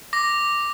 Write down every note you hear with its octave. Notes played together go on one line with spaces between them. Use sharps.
D6 A#6